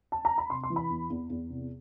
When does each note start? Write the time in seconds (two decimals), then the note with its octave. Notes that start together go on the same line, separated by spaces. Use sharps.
0.12 A5
0.25 A#5
0.38 B5
0.50 C3 C6
0.64 C6
0.70 E3
0.76 B5
0.90 E2
1.10 E2
1.30 E2
1.50 C3